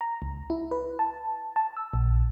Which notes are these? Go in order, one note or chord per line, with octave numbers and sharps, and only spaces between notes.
A#5
C#2
E4
B4
A5
A5
E6
A#1